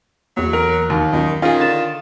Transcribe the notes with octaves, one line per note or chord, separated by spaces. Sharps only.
E2 F#3 A#3
A#4
D#2
F#2 A#2 D#3
D#3 C#4 F4 G#4
D3 A6 E7